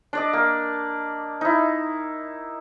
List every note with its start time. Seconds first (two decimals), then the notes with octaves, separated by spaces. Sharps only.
0.13 D4 D5 D#5
0.33 A#3
1.41 D#4 E4